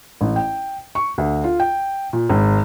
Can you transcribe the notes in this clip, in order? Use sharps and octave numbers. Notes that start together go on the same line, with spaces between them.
A1
G5
C#6
D2
F4
G5
A#2
G#1